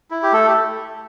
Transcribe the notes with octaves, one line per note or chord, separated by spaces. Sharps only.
E4
G4
A3 A4
G4